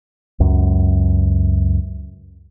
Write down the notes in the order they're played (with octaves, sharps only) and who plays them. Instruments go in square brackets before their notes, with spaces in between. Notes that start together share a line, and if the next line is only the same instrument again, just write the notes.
[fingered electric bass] C#2 F#2